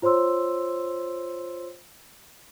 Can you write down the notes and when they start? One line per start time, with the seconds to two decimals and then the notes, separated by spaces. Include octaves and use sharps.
0.02 F4 C5 C#5 C6 E6